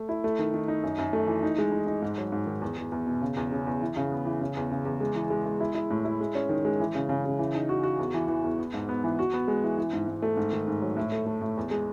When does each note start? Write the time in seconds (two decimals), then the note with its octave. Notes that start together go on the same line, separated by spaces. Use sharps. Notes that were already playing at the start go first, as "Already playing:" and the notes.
Already playing: A3
0.09 E4
0.24 A3
0.39 D#3
0.54 D#3
0.68 D#4
0.83 F#2
0.98 F#2
1.13 A3
1.27 E3
1.43 D#4
1.58 G#3
1.72 D#4
1.87 D#4
2.02 G#2
2.18 F#3
2.32 G#2
2.47 D#3
2.61 E2
2.78 E2
2.92 E2
3.06 B2
3.21 C#3
3.37 E2
3.52 C#3
3.67 E2
3.82 E3
3.96 C#3
4.12 B3
4.26 E3
4.41 C#3
4.57 E2
4.71 C#3
4.85 E2
5.00 G#3
5.15 E3
5.30 G#3
5.46 G#3
5.60 E4
5.75 E4
5.90 A2
6.05 E4
6.21 G#3
6.35 C#4
6.49 D#3
6.65 G#3
6.80 E3
6.95 C#3
7.09 C#3
7.25 C#3
7.39 E3
7.55 D#4
7.69 F#4
7.83 F#4
7.99 E2
8.14 E3
8.28 E3
8.44 E2
8.58 B3
8.74 G#2
8.89 B3
9.04 E3
9.19 F#4
9.34 B3
9.48 G#3
9.64 E3
9.78 E3
9.93 G#2
10.08 G#2
10.22 A3
10.37 G#2
10.52 D#3
10.68 G#2
10.82 F#3
10.97 A2
11.12 A3
11.26 A3
11.41 A2
11.57 E2
11.71 G#3